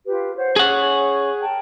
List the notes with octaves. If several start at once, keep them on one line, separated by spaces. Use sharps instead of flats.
F4 G4 B4
C5 C#5 F#5
C#4 G#4 C#5 F#5 C#6
A#4 G5 A5